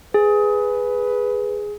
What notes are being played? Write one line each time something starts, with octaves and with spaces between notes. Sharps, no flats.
G#4 B4